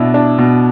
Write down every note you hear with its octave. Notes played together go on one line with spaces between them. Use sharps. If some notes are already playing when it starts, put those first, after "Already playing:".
Already playing: B2 D4 E4
D4
B2